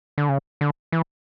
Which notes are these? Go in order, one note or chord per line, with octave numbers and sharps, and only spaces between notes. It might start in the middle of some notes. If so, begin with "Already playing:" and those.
D3
C#3
D3
E3